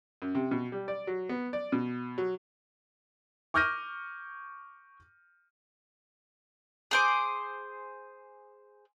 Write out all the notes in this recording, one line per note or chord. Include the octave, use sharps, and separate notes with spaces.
F#2
C3
B2
G3
D5
F#3
B3
D5
B2
F#3
C#6 D6 F6 G6 A#6 D#7
G#4 C5 D6